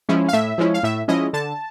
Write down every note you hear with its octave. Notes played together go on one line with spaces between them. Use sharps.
F3 G#3 C#4 E4
F5
A2 E5
F3 G#3 C#4 E4
F5
A2 E5
F3 G#3 C#4 E4 D#5
D3 A5